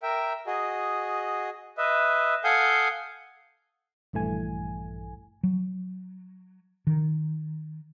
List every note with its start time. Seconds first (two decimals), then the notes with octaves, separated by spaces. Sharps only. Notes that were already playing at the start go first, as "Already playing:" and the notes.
0.03 A#4 E5 G5
0.46 F#4 G#4 D#5
1.78 B4 D#5 E5
2.44 A4 F5 F#5 G#5 D#6 G6
4.13 A#1 G2 E3 A3 G#5
5.43 F#3
6.87 D#3